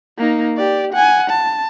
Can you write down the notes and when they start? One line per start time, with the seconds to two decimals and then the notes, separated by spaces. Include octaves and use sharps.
0.18 A#3 D#4
0.57 G4 D5
0.93 F#5 G#5
1.30 A5